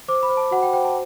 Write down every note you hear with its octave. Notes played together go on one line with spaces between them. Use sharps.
C5 D6
B5
C5
A5
F#4 F#5
G5
C5 G5
A5